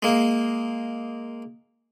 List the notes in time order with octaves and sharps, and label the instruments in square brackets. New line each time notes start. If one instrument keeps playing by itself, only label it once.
[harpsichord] G#3 A#3